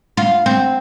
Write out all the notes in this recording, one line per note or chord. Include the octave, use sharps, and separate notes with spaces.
F4
C4